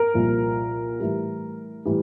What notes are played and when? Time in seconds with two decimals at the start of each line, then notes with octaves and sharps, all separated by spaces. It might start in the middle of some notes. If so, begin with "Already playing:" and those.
Already playing: A#4
0.14 C2 A#2 F3
1.00 A2 E3 G3
1.85 A2 E3 G3